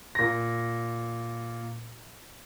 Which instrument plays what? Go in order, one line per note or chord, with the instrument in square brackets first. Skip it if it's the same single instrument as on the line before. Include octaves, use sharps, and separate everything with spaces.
[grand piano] A#2 A#6